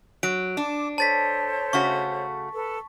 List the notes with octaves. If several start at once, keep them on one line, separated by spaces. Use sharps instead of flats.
F#3 D7
D4 A5 D6
A4 C5 C#5 A5 A6 B6
C#3 A3 F#4 C#6
A4 B4